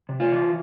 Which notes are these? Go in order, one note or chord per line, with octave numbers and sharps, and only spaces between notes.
C3
F4
E3